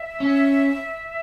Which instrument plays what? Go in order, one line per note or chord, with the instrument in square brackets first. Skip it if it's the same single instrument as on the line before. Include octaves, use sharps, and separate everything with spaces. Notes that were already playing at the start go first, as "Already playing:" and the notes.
Already playing: [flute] E5
[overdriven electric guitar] C#4